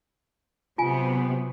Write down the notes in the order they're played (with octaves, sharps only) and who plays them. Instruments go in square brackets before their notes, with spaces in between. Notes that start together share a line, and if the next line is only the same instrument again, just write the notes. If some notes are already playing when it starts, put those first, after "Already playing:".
[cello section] C3 F#3 B3 [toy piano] F4 G#5